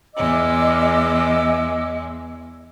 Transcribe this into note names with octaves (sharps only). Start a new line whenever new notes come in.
E2 G#3 D#5 D6 E6